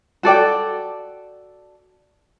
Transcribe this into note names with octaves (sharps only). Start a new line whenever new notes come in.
F#4 A4 D5 G5